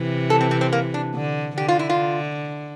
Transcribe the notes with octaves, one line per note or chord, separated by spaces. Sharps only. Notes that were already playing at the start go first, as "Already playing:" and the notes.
Already playing: C3 E3
A4
C4
C4
C4
A#3
D4
D3
D3 G4
F4
E4
F4